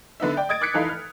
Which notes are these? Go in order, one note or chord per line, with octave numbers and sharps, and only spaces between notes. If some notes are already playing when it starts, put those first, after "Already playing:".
D3 B3 D#4 E5
D5 G5
D#5 D#6 G#6 A6 D7
D6 F#6 G#6 B6 C#7 D7
F1 E3 D#4 A4 F5 B5
F6